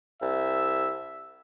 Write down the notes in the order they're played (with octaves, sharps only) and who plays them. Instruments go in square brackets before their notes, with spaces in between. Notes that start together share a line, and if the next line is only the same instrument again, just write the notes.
[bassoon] C2 [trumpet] E5